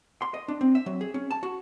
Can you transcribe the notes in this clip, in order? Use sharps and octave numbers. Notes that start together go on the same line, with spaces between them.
C6
D#5
D4
C4
E5
F#3
G#4
C#4
A5
F#4